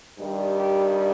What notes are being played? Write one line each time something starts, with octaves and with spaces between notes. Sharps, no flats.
G2 D#3 G3
G4